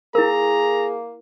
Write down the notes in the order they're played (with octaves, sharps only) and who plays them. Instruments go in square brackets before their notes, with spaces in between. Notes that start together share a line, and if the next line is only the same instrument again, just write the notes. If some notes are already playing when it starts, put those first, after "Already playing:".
[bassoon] A#3 [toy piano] E4 A#4 [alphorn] G#4 [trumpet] A#5